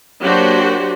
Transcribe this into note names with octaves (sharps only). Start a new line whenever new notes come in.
F#3 A#3 D4 F#4 G4 C5